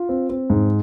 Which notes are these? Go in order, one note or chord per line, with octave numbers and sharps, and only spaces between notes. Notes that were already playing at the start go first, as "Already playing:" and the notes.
Already playing: F4
C4
C4
G#2